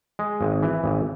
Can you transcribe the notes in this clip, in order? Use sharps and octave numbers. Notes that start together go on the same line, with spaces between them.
G#3
G#1
E3
G#1